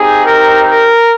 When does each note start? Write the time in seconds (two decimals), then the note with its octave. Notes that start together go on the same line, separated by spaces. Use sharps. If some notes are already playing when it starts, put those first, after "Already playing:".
Already playing: C4 D#4 G4 G#4
0.25 A#4
0.67 A#4